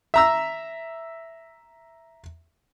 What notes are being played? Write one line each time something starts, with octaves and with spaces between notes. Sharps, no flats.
E5 A#5 E6